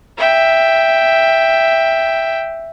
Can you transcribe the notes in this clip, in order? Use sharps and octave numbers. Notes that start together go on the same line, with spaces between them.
E5 G5